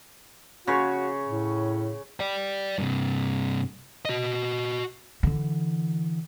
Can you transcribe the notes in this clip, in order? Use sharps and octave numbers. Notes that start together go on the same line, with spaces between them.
C#3 F#4 C#5
A2
D5 G5
G2 C3
F#4 D#5
D3 E3